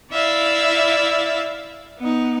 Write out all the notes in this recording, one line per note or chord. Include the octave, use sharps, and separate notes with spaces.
E4 D5 E5 F5
B3 D#4